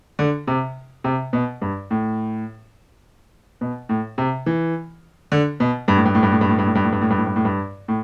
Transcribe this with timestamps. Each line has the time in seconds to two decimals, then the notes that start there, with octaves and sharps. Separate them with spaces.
0.19 D3
0.47 C3
1.04 C3
1.33 B2
1.62 G2
1.91 A2
3.61 B2
3.89 A2
4.18 C3
4.46 E3
5.32 D3
5.60 B2
5.88 G2
5.97 A2
6.05 G2
6.15 A2
6.23 G2
6.32 A2
6.41 G2
6.49 A2
6.58 G2
6.67 A2
6.75 G2
6.84 A2
6.92 G2
7.01 A2
7.10 G2
7.18 A2
7.27 G2
7.36 A2
7.45 G2
7.88 A2